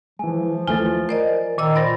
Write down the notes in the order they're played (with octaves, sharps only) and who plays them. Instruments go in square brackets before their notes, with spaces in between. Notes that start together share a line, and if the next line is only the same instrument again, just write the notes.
[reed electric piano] E3 G#3 [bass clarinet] F3 [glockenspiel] G#5
[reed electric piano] D#2 E3 A3 [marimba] F4 [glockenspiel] G#5 A6
[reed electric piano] A#4 [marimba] C5 D5 D#5
[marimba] A#2 D#5 E6 [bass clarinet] D#3
[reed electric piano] F4 C5 [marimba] D5 [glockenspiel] B5 A6 A#6